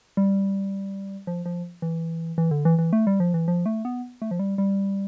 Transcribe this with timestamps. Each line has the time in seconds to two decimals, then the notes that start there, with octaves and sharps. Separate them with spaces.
0.17 G3
1.27 F3
1.46 F3
1.82 E3
2.38 E3
2.51 D3
2.65 E3
2.79 E3
2.93 A3
3.07 G3
3.20 F3
3.34 E3
3.48 F3
3.66 A3
3.85 B3
4.22 A3
4.31 F3
4.39 G3
4.58 G3